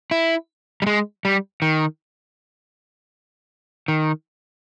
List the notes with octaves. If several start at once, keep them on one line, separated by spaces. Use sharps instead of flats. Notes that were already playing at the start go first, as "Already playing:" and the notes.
E4
G3
G#3
G3
D#3
D#3